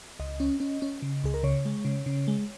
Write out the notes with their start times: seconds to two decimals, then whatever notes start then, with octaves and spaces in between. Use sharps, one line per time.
0.19 C#2 D#5
0.40 C#4
0.60 C#4
0.82 C#4
1.02 C#3
1.24 C#2 G#4
1.34 A#4
1.43 C#3 C#5
1.65 G#3
1.85 C#3
2.06 C#3
2.28 G#3